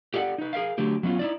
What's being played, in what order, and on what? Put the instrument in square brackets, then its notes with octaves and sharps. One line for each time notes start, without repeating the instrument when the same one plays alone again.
[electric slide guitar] G4 A4 D5 E5 F#5
D#4 B4
G#4 A#4 E5 F5
D3 F#3 A3 G4
F#3 B3 C#4 F4
D#4 E4 D5